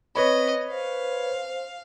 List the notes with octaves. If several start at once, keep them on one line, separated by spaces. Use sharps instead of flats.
C4 B4 C#5 D#5 B5
C5 F5